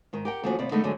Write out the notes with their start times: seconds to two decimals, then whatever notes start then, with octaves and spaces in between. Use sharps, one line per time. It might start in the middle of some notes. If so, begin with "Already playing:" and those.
0.13 G#2 D#3
0.25 G4 A#4 F#5 G5
0.44 D#2 F3 A3 C#4 F#4
0.59 D#2 C3 B3 D5
0.71 D3 G#3 A3 B3 D#4
0.84 D2 D3 F#3 G#3